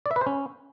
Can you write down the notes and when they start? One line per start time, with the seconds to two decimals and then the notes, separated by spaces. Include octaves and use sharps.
0.06 D5
0.11 E5
0.16 B4
0.21 C5
0.27 C#4